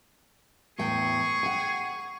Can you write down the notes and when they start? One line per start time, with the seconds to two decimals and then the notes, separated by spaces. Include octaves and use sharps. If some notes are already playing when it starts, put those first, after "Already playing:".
0.78 E2 A2 G#4 G5 C#6
1.43 F#5 G5